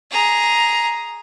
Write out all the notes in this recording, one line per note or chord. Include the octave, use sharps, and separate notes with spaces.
G#4 A#5